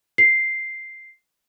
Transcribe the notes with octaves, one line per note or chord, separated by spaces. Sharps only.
C7